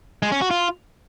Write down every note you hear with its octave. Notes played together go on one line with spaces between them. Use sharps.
G#3
C#4
F#4
F4